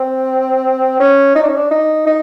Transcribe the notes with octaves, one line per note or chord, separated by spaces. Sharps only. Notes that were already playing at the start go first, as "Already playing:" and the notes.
Already playing: C4
C#4
D#4
D4
C#4
D4
D#4
D#4